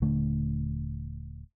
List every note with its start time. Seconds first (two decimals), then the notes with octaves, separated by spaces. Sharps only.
0.02 D#1 D3 A3